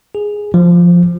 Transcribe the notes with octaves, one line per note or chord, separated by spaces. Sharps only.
G#4
F3